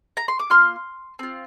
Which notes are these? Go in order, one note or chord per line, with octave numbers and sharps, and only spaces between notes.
A#5
C6
D6
A#3 F4 C6 F6
C4 F4